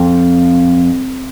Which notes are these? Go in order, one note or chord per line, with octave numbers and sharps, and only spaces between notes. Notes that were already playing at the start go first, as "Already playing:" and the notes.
Already playing: F2